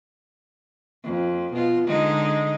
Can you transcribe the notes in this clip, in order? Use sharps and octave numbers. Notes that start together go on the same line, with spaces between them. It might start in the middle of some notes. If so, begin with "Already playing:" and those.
F2
B2 F4
D3 G#3 D#4